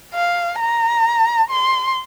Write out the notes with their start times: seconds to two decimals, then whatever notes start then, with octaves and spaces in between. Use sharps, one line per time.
0.14 F5
0.60 A#5
1.50 C6